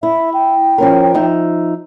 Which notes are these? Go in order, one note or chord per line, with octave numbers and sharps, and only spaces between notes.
E4 E5
G5
F3 C#4 A#4
F3 D#4 E5